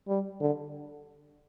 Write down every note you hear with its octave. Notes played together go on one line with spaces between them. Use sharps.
G3
D3